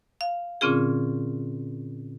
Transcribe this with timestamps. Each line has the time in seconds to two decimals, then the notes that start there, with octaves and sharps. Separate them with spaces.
0.21 F5
0.61 A#2 D3 C4 C#4 F4 G#4